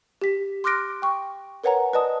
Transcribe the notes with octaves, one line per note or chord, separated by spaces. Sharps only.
G4 B6
C6 D6 F6 F#6 A#6 D7
G5 C#6
A#4 B4 C#5 F#5 G#5 A#5
B4 D5 D#5 A5 D#6